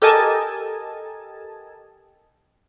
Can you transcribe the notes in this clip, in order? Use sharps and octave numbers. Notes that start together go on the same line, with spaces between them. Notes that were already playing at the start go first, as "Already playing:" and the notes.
G4 A4 A#4 D#5 G#5 A5